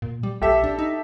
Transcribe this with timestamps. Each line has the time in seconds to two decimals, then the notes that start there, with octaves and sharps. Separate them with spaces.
0.02 A#2
0.23 G3
0.42 A#1 G4 A4 E5
0.64 D4
0.79 D#4